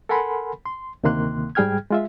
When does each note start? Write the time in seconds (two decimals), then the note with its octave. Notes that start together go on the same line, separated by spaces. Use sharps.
0.09 A4 A#4 F#5 G#5 B5 C6
0.66 C6
1.03 D2 C3 D#3 A#3 C6 F#6
1.55 G#2 G3 G#4 G5 F6 G#6
1.91 G#3 F4 E5